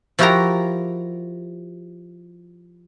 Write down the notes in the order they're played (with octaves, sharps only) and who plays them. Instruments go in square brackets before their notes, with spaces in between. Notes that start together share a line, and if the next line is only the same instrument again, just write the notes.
[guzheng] F3 E4 F#4 G4 A#4 A#5